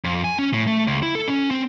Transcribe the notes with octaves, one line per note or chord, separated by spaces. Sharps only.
F2
G#5
C#4
A2
A3
C#2
E4
A4
C#4
C4